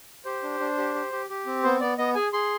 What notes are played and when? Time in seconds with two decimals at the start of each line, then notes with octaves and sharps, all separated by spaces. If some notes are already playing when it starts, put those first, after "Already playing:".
0.25 G4 C5
0.43 D4
0.60 D4
0.78 G4
0.95 G4
1.12 G4
1.30 G4
1.46 C4
1.63 B3 C5
1.81 B3 D5
1.98 B3 D#5
2.15 G#4 G#5
2.33 G#4 C6